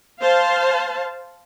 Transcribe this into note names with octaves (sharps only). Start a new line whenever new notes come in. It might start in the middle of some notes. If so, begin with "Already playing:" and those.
C5 F5 A5